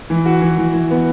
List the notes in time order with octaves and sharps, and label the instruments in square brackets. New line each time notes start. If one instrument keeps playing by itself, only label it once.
[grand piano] E3
F#4
E3
E3
E3
B3